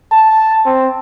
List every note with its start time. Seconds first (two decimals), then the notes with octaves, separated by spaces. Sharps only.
0.12 A5
0.65 C4